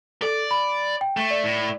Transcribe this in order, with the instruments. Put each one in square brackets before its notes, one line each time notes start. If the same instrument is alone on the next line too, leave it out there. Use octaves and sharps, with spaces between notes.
[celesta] A4 [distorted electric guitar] D5
[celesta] B5
G5
[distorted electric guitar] A3
[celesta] D5
[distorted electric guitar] A2